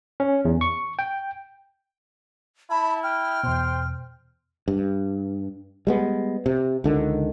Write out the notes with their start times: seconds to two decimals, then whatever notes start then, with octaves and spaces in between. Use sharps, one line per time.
0.20 C#4
0.45 E2
0.61 C#6
0.99 G5
2.70 E4 A5 B5
3.03 G5 F6
3.43 E2 B2 C5
4.68 G2
5.87 G3 G#3 B3
6.46 C3
6.84 C#2 D3 D#3